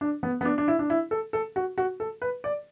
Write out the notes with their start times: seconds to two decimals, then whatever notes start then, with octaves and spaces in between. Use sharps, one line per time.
0.01 D4
0.23 B3
0.41 B3
0.45 D4
0.58 D4
0.68 E4
0.79 D4
0.90 E4
1.11 A4
1.33 A4
1.56 F#4
1.78 F#4
2.00 A4
2.22 B4
2.44 D5